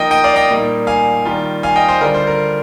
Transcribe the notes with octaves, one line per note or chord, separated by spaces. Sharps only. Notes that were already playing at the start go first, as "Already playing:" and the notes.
Already playing: F3 A#3 D#4 D#5 G5
D#5 G5
D5 F5
D#5 G5
A#2 G3 A#3 D#4
F5 G#5
D#3 G3 A#3 F4
F5 G#5
D#5 G5
C5
D3 G3 D4 F4 A#4
C5
A#4